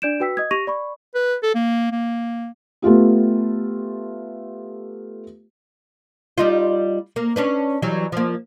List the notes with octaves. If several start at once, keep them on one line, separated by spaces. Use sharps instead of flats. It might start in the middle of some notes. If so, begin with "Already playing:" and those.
D4 D5 G6 D7 E7
F#4 B4 G5 E6 B6
D#5 D#6 G#6
G4 C#6 A#6 D#7 F7
D5 B5 C#6
B4
A4
A#3
A#3
A3 B3 F4 G4
G3 D#4 F4
A#3
C#4 D4 B4
E3 F#3 G3
F3 A#3